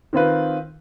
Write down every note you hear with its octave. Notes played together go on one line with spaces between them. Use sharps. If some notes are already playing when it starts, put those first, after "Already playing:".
D#3 C4 F4 B4